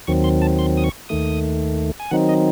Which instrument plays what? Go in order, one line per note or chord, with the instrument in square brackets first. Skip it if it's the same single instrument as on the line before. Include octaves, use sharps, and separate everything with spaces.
[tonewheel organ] D#2 D#3 F#3 C4 C#6
C6
A5
C6
D#6
C#6
D#2 D#3 A3 D#6
G#5
D#3 F#3 C4 D#4 F#5
D#5